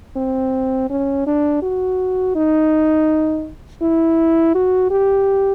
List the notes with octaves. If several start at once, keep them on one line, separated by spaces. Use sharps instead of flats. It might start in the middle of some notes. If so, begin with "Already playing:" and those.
C4
C#4
D4
F#4
D#4
E4
F#4
G4